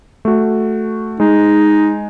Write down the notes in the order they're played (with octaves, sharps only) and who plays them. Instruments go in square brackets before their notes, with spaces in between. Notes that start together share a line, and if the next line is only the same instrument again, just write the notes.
[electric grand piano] A3 F#4
[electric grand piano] G#3 [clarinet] D#4